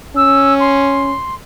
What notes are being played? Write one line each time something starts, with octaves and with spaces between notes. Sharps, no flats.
C#4 E6
C6